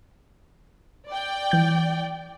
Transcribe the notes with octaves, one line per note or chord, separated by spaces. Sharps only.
D5 G5
E3 G6